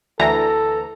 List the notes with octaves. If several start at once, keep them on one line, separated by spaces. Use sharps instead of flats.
D2 E3 A4 A#5